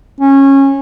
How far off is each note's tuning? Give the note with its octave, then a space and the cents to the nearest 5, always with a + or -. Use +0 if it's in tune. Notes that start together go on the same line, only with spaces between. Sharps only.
C#4 -20